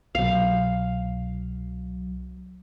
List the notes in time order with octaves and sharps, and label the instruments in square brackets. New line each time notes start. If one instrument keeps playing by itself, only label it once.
[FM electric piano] C2 B2 F#3 [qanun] F5